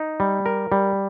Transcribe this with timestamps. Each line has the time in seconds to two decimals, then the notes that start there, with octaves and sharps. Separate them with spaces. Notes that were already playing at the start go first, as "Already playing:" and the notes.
Already playing: D#4
0.20 G3
0.46 A#4
0.72 G3